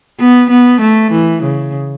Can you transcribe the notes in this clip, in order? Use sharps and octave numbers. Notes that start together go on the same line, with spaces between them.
B3
B3
A3
E3
C#3